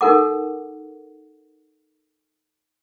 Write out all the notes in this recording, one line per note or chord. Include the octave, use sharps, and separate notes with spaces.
D#4 A4 A#4 F#5 D6